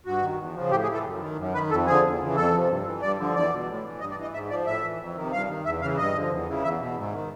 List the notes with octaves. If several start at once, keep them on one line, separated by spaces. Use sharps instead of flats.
G2 F#4
D#3
E2
C#3 F3
A2 G4
G#4
E3
A4
F#2
D#3
F#2
D#3 B4
F2 A4
D3 F3 G#4
E2
C#3 E3
F2 A4
C3 F3
G2
E3
G2 D5
D3 F3
E2 D5
B2
A2
E3
G2 D#5
D5
E3 D#5
G#2 E5
F3 D5
A2 E5
E3
F2
D#3
C3
G2 F5
D#3
E2 E5
C#3 E3 F5
G2 D#5
D3 F3
E2
C#3 E3
E2 E5
B2
G#2
D#3